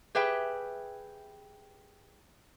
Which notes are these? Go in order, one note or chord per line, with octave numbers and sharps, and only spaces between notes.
G4 G#4 B4 E5 G5